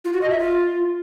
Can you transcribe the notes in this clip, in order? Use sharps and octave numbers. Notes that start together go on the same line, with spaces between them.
F4
F#4
D#5
E5
F4